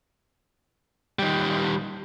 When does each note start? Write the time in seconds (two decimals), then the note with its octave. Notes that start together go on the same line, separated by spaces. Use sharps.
1.19 D#3 G3